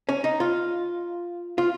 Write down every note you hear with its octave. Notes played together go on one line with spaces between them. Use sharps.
C#4
D#4
F4
F4